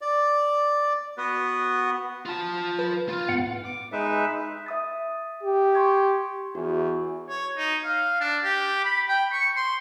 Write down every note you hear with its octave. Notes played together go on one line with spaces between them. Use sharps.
D5
B3 F#4 B4
F4 A5
B4
F4
G#2 B3 F#5
D6
G#3 D#4 B4 E5
E5 D#6 A6
G4
C6 C#6 G#6
E2 F#4
C#5
D#4
F5
D4
G4
B5
G5
C#6
C6